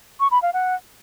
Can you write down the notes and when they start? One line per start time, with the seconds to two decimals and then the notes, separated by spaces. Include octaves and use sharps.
0.20 C#6
0.31 B5
0.42 F5
0.53 F#5